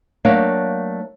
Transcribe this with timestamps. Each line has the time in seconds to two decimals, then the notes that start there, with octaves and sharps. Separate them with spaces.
0.25 F#3 A3 A#3 D4 C#5 F5